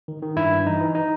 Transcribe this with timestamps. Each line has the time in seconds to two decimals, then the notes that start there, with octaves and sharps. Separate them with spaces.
0.08 D#3
0.22 D#3
0.37 G2 E4
0.51 G2
0.66 E3 D#4
0.81 E3
0.95 D#4